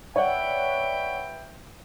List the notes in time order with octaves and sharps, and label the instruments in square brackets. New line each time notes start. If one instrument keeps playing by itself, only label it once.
[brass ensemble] B4 E5 G5 [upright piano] C#5 D5 F#5